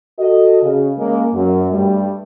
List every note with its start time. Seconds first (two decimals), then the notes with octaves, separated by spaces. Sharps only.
0.19 F#4 A4 D#5
0.63 C#3
0.98 C#3 G#3 A#3
1.33 F#2
1.72 G2 G3 A3